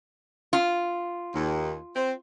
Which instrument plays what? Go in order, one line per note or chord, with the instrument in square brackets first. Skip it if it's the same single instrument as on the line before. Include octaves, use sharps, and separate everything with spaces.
[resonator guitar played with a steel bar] F4
[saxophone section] D#2
C4